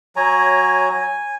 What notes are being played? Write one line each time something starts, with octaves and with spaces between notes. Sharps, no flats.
F#3 C#5 G#5 A#5
G#5